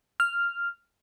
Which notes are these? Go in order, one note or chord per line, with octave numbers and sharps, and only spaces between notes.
F6